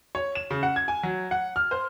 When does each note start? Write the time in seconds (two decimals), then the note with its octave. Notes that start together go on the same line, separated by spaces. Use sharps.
0.15 C#5
0.35 E7
0.51 C#3
0.63 F#5
0.76 G#6
0.88 G#5
1.03 F#3
1.31 F#5
1.56 F6
1.71 C5